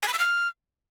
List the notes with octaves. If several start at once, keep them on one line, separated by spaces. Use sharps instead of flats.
G#5
B5
E6
F6